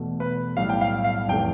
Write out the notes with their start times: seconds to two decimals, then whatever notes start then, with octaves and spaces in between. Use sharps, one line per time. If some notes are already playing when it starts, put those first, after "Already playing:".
Already playing: E2 B2 A3
0.20 B4
0.56 B1 A2 G3 F5
0.69 G5
0.81 F5
1.04 F5
1.28 F1 E3 A3 G5